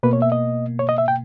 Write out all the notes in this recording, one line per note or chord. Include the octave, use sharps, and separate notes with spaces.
B2 A#3 B4
C#5
E5
D#5
C#5
D#5
E5
G5